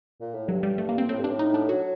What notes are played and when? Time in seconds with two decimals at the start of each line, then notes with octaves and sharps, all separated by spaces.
0.21 A#2
0.34 A2
0.48 G2 F#3
0.63 G3
0.78 A3
0.89 A#3
0.98 C4
1.08 A2 C4
1.18 G2
1.24 D4
1.29 A2
1.39 D#4
1.54 D4
1.69 F#3 F#4